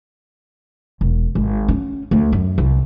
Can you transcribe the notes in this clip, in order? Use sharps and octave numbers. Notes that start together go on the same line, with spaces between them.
E1
G#1
C#4
D2
F#2
C2